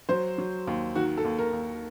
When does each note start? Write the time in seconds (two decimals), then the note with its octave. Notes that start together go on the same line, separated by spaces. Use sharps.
0.09 F#3 C5
0.38 F#3
0.67 D#2
0.96 D#3 F#4
1.17 A4
1.25 D#2
1.39 A#4
1.53 D#2